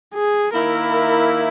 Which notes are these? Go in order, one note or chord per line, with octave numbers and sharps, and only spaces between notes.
G#4
D#3 A#3 E4 A#4